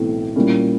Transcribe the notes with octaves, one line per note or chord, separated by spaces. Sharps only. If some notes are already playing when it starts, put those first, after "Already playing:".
Already playing: B1 A2 E3 A3 C4
A#2 G3 A#3 C#4 E4